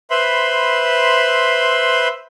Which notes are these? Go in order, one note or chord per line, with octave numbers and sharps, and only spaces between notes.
B4 C5 E5 B5 C6